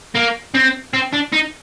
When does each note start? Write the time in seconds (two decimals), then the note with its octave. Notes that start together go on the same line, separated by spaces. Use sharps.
0.15 A#3
0.54 C4
0.94 C4
1.13 D4
1.33 D#4